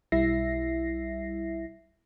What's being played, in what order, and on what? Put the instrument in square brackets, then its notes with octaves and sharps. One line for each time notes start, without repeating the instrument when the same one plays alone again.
[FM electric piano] B1 G3 E4 E5 A#6 C7